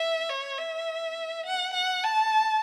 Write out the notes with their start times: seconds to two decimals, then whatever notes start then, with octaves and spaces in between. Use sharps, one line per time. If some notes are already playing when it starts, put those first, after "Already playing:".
Already playing: E5
0.29 C#5
0.58 E5
1.45 F#5
1.74 F#5
2.04 A5